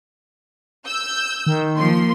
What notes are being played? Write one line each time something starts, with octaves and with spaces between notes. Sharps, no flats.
E6 G6
D#3
F3 A#3 C6